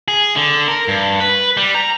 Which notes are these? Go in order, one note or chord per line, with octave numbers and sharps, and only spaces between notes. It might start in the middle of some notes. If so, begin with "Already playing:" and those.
G#4
D3
A#4
G2
B4
G3
A#5